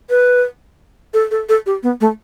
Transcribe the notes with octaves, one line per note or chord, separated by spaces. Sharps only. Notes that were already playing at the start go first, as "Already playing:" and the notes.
B4
A4
A4
A4
G4
B3
A3